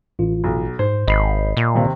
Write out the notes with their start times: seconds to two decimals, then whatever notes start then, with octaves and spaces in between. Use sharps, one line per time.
0.19 A1 F4
0.44 B1
0.79 G#2 C5
1.08 G#1 D#5 B5 C7
1.57 A#2
1.75 D#2 C3